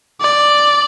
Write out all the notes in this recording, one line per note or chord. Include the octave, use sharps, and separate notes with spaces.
D5